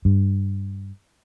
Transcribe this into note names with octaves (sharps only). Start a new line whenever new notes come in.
G2